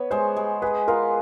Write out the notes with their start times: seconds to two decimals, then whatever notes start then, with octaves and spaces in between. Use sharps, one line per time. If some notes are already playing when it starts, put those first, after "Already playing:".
Already playing: B3 C#5
0.11 G#3 C5
0.37 G#3
0.62 G#4 B4
0.88 F4 A#4